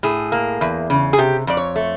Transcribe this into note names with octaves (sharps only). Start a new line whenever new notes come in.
A2 G#4
A#3
E2
C#3
G#4
C3 G4
F2 D5
C#5
A3